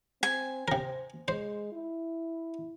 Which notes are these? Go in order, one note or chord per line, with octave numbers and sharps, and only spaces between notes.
C4 G#5
C3 A#4 C5
G#3 C5
E4